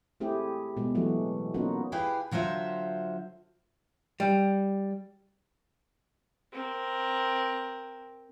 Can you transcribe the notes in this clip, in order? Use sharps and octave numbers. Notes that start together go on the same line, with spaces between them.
A3 C4 E4 G4 G#4
B2 G#3
E3 F#3 A3 F#4
A#3 B3 C#4 D#4 F4 F#4
E4 G4 G#4 B4 F5
D3 F#3 F4 C5 E5
G3
C4 A#4